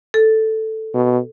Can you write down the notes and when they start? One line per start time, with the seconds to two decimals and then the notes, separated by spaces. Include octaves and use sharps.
0.14 A4
0.94 B2